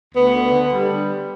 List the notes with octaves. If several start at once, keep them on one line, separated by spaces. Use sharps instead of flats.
D2 B3
D3
D3
G3